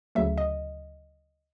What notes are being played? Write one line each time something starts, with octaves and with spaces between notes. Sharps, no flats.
D2 C#3 F#3 A3 E5
D#5